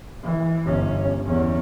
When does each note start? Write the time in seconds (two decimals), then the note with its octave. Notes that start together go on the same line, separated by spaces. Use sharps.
0.23 E3
0.63 G1 C#4
1.26 E2 C#4